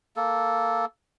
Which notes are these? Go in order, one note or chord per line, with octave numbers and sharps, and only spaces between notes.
A#3 A4